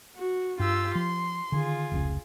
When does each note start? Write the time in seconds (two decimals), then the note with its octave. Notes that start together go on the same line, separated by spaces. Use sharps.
0.15 F#4
0.59 G2 F4 G4 E6
0.95 F3 C6
1.52 D3 D#3 F4 G#4
1.92 F1 C#2